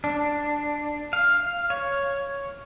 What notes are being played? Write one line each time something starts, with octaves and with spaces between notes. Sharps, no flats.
D4
F5
C#5